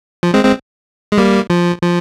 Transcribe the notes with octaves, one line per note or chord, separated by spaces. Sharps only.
F3
G#3 C4
G#3 C4
G#3
G3 A#3
F3
F3